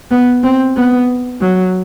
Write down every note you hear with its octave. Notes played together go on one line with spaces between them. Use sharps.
B3
C4
B3
F#3